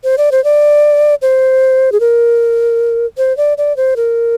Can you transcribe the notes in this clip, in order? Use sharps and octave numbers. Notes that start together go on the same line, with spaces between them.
C5
D5
C5
D5
C5
G#4
A#4
C5
D5
D5
C5
A#4